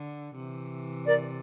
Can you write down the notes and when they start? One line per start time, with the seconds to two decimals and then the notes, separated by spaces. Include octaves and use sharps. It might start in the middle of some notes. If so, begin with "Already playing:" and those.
Already playing: D3
0.36 C3 E3
1.06 A#4 D5